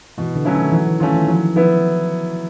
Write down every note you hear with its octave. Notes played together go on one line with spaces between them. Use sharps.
B2 E3
D3
F#3 A3 C#4 E4
D#3
E3 F#3
E3
D#3 A3 C#4 F4
E3
F3 F#3
F3 B3 E4